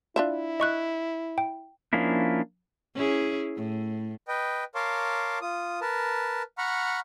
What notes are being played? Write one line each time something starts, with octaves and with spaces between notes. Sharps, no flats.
D4 E4 F4 E5
D#5 C#6 F#6
G5
F3 A#3 C#4 D4 E4
C#4 E4 G#4
A2
B4 D#5 G5
A#4 C#5 F5 A5 C6 D6
F4 D#6
A#4 B4 A5
F#5 A#5 B5 C#6 F6